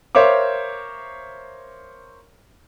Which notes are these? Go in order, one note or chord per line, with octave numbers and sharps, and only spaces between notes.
A#4 C5 C#5 E5 F5 D6